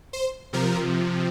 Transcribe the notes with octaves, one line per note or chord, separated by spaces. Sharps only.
C5
C3 F3 A#4